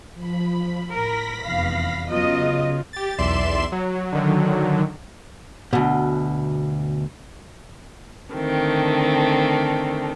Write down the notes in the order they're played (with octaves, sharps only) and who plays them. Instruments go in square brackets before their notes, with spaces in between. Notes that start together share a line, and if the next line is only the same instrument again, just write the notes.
[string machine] F3 B5
[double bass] A2 [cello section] A#4 [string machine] B5 A#6 B6
[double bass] F1 [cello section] E2 F5
[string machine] C#3 [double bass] F#3 B3 [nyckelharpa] F4 [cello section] D#5
[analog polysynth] G4 A6
B1 E2 D5 E5 C6 E7
F#3
D3 D#3 F#3
[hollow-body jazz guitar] D2 B2
[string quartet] D3 D#3 A3 C4